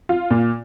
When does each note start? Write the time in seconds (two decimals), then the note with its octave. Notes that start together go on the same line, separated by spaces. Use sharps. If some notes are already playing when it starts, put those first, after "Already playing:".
0.09 F4
0.31 A#2